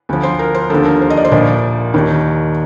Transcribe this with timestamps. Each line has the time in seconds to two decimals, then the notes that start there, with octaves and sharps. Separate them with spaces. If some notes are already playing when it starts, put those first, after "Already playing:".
0.09 D2 D3 F3
0.23 C5
0.39 A#4
0.55 C5
0.70 D#2 D3 F3 A4
0.85 A#4
1.01 C5
1.10 D#5
1.17 D5
1.25 C5
1.31 A#1 A#2 F3 D5
1.94 D#2 D#3